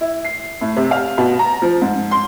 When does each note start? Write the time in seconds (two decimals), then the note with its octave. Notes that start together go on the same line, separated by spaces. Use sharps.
0.01 E4
0.25 C7
0.61 A2
0.76 C3
0.91 F5
1.18 B2
1.39 A#5
1.62 F3
1.81 G#2
2.11 C6